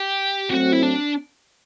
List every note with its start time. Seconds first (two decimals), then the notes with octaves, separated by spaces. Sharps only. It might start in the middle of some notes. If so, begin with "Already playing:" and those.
Already playing: G4
0.50 F#3 A3 C4 F#4
0.73 E4
0.83 D4